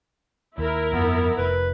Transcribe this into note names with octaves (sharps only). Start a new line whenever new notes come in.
D#2 E4 A#4
G1 F2 F3 B3
F1 B4